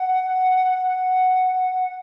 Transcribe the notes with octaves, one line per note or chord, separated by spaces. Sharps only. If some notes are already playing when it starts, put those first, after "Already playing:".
Already playing: F#5